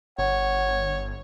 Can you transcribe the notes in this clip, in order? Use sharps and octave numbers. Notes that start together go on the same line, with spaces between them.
G1 C#5 F#5